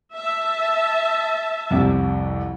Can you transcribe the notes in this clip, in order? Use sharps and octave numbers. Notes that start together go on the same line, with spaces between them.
E5 A5
C2 F2 C3